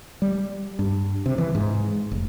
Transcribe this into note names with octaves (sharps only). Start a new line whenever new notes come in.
G3
G2
C3
E3
G#2
F1